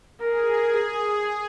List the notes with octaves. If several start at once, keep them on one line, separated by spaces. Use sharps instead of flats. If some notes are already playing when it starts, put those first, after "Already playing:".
G#4 A#4
G#4